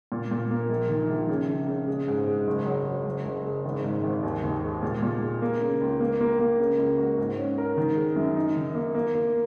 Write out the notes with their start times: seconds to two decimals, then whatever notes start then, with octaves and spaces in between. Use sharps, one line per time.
0.12 A#2
0.31 A#2
0.51 A#3
0.69 A#1
0.89 D#3
1.10 A#1
1.29 C#3
1.49 C#3
1.68 C#3
1.87 G#3
2.08 G#2
2.28 G#3
2.47 F#1
2.66 F#3
2.86 F#3
3.06 F#1
3.25 F#1
3.45 G#3
3.65 G#1
3.84 G#2
4.04 G#1
4.23 D#2
4.43 D#2
4.63 G#3
4.83 A#2
5.03 A#2
5.22 G#3
5.42 A#3
5.61 C#3
5.81 C#2
6.00 A#3
6.21 A#3
6.39 A#3
6.59 C#3
6.79 C#2
6.98 F#4
7.18 G#2
7.38 C#4
7.58 A#4
7.77 D#3
7.97 G#3
8.16 F#2
8.36 D#4
8.56 D#3
8.75 A#3
8.95 A#3
9.15 A#3